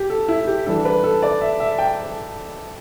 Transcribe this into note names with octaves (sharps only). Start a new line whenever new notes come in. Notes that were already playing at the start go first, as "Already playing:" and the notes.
Already playing: G4
A4
E4
G4
E3 G3 D4 A4
B4
A4
D5
E5
E5
G5